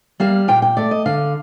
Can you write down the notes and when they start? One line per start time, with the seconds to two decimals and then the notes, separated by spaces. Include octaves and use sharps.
0.20 G3 A#3 F5
0.48 A#2 G5
0.62 G5
0.77 A3 D5
0.91 D#5
1.06 D3 F5